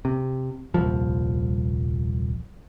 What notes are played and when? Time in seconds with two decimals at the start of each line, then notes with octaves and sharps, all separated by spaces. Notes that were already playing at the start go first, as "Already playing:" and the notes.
0.05 C3
0.74 D#1 C2 F3